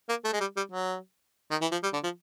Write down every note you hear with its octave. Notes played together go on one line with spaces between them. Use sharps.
A#3
A3
G#3
G3
G3
F#3
D#3
E3
F3
G3
D3
F3